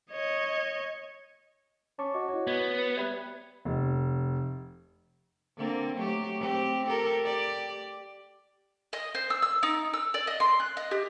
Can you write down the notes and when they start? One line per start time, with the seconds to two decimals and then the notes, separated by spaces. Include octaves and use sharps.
0.11 C#5 D#5
1.99 C#4 A5 C#6 D6
2.14 F#4 D#5
2.29 E4 C#5 D#5
2.47 B3 G#6
2.78 B4 C#7 D#7
2.97 G3 E5 B5 F#6 G#6
3.65 F1
5.57 D3 A#3 C4
5.96 F#3 A3 G4
6.40 C4 G4
6.86 G4 A4 A#4
7.22 G4 D5
8.93 D#5
9.15 C5
9.30 E6
9.42 E6
9.63 D#4
9.94 E6
10.14 D5
10.27 D#5
10.40 C6
10.60 F#6
10.77 D#5
10.91 G4